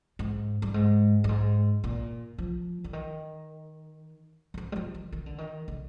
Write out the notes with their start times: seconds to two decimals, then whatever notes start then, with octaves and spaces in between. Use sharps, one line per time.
0.19 G#2
0.62 G2
0.74 G#2
1.24 G2
1.29 G#2
1.84 A#2
2.38 F3
2.84 D3
2.93 D#3
4.54 D#3
4.58 F3
4.72 G3
4.76 F3
4.94 D#3
5.12 D#3
5.26 D3
5.38 D#3
5.68 D3